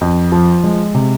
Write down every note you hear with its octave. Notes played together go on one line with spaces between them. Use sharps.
F2
F3
G#3
C3